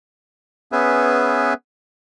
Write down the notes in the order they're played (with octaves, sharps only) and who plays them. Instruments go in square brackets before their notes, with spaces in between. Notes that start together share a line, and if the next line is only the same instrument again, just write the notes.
[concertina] B3 C#4 G#4 B4 E5